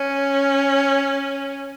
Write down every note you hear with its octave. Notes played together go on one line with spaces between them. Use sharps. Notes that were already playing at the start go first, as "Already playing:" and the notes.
Already playing: C#4